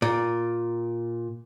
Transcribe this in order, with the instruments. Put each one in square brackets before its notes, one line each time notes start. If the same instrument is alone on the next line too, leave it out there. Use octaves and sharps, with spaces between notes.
[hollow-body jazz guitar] A#2